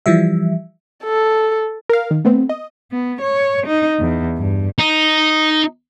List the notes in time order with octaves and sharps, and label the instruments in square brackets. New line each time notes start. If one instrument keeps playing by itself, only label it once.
[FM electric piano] E3 F3 G3 E5
[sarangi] A4
[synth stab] A#4 F5
D#3
A3 B3 C4
D#5
[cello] B3
C#5
D#4
E2
G2
[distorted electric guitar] D#4